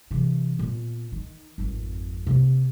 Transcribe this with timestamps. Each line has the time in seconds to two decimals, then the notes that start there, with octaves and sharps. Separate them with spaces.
0.11 C3 E3
0.59 A#2 B3
1.12 D#3
1.58 G#1 F2
2.27 C3 A#3